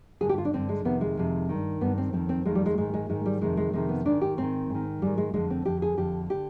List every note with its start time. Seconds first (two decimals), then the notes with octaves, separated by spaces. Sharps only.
0.21 G2 D3 G#4
0.29 G4
0.38 F4
0.45 D4
0.53 G2 D3 C4
0.69 G#3
0.85 F2 C3 D#3 B3
1.01 G#3
1.17 F2 C3 D#3
1.49 G2 D#3
1.81 G2 D#3 B3
1.98 C4
2.13 F2 D#3 C4
2.29 C4
2.45 F2 D#3 G#3
2.55 G3
2.66 G#3
2.78 G#2 D#3 G#3
2.94 G#3
3.09 G#2 D#3 G#3
3.26 G3
3.41 F2 C3 D#3 G#3
3.57 G#3
3.73 F2 C3 D#3 G#3
3.89 B3
4.06 G#2 D#3 D4
4.21 G4
4.37 G#2 D#3 C4
4.70 G#2
4.75 D#3
5.02 G#2 D#3 G3
5.18 G#3
5.33 F2 D3 G#3
5.50 C4
5.65 F2 D3 G4
5.82 G#4
5.97 F2 D3 G4
6.30 D3 G4